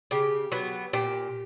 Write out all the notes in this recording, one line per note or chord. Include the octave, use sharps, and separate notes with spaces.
C#3 G4
F#3 B3
A#2 G4